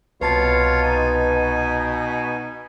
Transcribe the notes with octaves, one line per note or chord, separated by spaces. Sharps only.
C2 B2 F4 B4 C#5 F5 A5 A6
D#4 G#5